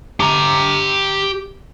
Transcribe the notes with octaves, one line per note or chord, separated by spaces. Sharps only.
G4 A#5